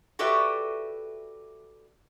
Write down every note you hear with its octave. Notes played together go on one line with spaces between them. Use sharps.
F#4 G4 A4 B4 D5 E5